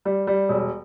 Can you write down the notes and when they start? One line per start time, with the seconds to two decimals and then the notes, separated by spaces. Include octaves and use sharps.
0.05 G3
0.27 G3
0.49 E1